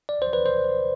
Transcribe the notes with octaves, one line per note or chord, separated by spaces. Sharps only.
D5
C5
B4
C5